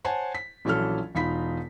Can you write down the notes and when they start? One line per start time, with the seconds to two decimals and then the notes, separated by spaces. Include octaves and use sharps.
0.04 C5 C#5 F#5 G#5 A5
0.35 B6
0.65 A#1 E3 F#3 C#4 A4 F6
1.15 E1 D#4 F4 B5 B6